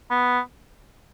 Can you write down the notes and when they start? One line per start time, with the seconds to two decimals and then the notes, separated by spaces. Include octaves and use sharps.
0.11 B3